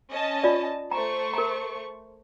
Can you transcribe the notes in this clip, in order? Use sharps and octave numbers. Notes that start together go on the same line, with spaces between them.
C#4 D#5 A5
F4 D5
A3 C5 A#5 C#6
A#4 A#5